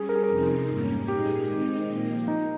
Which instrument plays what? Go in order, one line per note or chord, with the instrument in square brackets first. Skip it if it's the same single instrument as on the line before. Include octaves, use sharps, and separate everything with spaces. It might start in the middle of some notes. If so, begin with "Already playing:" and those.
Already playing: [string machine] G3 C#4 [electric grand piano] G#4
[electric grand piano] A#4
G#4
A#4
[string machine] F2 C3 F3 C4 D#4
G#2 G3 A#3 C#4
[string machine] A#2 G#3 D#4 G#4 [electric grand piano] G4
[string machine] D#3 G#3 C4 D#4
A#2 F3 A#3
[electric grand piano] D#4